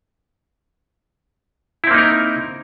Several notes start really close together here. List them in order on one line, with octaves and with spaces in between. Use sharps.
E4 C4 A#3 D#4 A#4